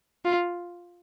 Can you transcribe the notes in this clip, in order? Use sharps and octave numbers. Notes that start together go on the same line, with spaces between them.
F4